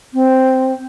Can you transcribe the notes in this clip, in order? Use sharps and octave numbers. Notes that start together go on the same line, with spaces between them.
C4